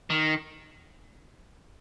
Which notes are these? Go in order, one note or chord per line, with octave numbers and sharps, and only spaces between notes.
D#3